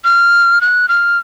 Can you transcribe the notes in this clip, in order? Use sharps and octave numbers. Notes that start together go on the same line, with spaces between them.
F6
F#6
F6